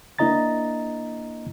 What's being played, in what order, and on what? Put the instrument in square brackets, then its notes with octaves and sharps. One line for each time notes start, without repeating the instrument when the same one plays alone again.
[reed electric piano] A#3 D4 E4 D#5 A#5 A6